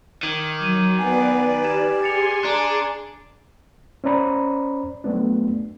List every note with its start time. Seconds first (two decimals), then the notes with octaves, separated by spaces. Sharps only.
0.23 D#3 D6 G#6 F#7
0.59 F#3 D6 G#6 D#7
0.99 B3 B4 D5 G#5 C7
1.63 G4 G#6 E7
2.03 G#4 G#5 C6 A6 C#7 F7
2.44 D4 A#5
4.04 C#4 C5 D5 A#5 B5
5.04 F#3 A3 B3 D4